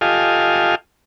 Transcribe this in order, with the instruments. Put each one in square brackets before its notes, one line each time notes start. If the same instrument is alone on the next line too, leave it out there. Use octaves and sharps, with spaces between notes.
[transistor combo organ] F4 G4 A4 D#5 F5 G#5